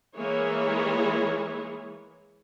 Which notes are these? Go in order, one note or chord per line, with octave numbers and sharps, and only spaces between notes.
E3 G#3 A#3 E4 C#5